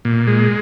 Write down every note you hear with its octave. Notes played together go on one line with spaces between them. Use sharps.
A#2
G#3